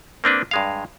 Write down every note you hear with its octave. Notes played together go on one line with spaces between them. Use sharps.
A#3 C4 D4 B4
G2 G#3 F5